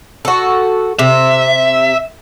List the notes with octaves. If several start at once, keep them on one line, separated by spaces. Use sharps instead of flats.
F#4 A4
C3 E5